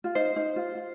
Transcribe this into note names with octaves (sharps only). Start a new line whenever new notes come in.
F4
D#4 C5
D#4
F4
F4